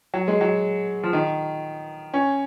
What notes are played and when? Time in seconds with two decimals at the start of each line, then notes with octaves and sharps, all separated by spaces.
0.14 F#3
0.28 G#3
0.41 F#3
1.03 F3
1.13 D#3
2.14 C#4